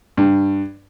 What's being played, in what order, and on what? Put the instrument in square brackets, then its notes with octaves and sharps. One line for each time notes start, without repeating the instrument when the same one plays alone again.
[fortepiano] G2